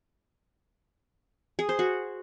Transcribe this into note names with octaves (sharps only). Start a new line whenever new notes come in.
G#4
C5
F#4